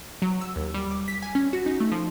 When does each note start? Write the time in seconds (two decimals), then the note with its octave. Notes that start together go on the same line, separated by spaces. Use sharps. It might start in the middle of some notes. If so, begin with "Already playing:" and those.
0.22 F#3
0.41 E6
0.56 D#2
0.74 G3
0.91 D6
1.08 B6
1.22 G#5
1.35 C#4
1.53 F#4
1.66 D#4
1.80 A3
1.92 F3